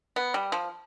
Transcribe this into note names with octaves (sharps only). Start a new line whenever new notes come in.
B3
G3
F3